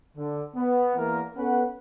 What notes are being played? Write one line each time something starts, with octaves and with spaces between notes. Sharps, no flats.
D3
B3
E2 A#3 A#4
B3 C#4 A4 B4 F#5